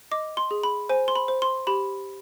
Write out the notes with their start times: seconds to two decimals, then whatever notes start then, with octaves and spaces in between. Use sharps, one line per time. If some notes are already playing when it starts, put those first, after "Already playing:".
0.11 D#5 D6
0.37 C6
0.51 G#4
0.63 B5
0.89 C5 G#5
1.08 C6
1.16 B5
1.28 C5
1.42 C6
1.67 G4 B5